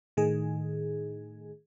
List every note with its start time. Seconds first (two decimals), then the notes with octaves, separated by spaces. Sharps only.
0.17 A2 D#3 G#4